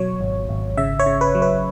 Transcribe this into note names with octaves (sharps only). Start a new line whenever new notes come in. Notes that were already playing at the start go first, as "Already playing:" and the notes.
Already playing: B2 F#3 C#5
G#1
G#1
C#3 E5
C#5
C#3
B4
F#3
B4